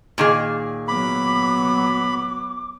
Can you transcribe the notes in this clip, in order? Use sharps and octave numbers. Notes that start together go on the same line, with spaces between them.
A#2 D#3 G#4
F#3 B3 B5 D6